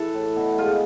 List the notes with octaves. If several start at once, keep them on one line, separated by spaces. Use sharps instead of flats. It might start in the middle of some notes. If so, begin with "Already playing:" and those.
Already playing: E3 A4 B4
A2
B2
G#3 F4